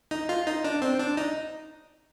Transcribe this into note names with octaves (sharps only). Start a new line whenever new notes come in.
D#4
F4
D#4
D4
C4
D4
D#4